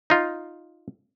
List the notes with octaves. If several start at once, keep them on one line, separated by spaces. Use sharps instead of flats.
D#4 F4